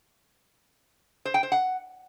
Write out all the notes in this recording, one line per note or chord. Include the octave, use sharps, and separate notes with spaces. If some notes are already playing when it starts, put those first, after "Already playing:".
C5
G5
C5
F#5